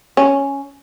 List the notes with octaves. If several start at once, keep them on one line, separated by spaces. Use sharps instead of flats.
C#4